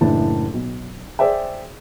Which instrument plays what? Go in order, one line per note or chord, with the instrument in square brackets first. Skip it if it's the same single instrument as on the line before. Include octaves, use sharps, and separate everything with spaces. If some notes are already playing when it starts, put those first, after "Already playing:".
[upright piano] F#1 A2 E3 D4 A5
B1
G#4 C5 D5 E5 G5